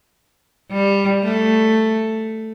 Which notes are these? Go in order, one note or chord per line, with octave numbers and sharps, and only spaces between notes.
G3
A3